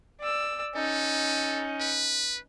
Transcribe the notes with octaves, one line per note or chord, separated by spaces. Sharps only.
D5 E6
C#4 D#4 A4
B4